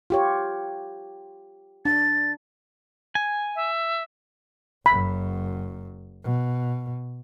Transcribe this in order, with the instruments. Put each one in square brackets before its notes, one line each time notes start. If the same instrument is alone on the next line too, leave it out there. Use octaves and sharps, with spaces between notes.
[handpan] F4 G4 C#5
[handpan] D4 [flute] A6
[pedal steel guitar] G#5
[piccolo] E5
[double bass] F#1 F#2 [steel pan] B5
[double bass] B2